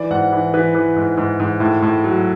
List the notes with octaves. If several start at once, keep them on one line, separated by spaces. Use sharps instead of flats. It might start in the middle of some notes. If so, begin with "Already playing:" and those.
Already playing: E3 D5
G#2 F#5
E3
E3 B4
E3
G#2
G#2
G#2
A2
A2
F#3